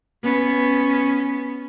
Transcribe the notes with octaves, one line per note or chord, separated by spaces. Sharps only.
B3 C#4